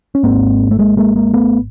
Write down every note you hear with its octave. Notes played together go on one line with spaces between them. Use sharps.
C#4
G#1 G#2 A#3 C4
A3
G#3 A#3
G#3 A#3
G#3 A#3
A3 B3